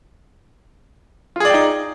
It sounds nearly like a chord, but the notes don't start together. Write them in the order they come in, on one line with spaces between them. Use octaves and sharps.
F4 G#4 D5 G5 D#4